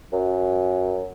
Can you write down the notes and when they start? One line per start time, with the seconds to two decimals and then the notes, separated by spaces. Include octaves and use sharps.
0.13 F#2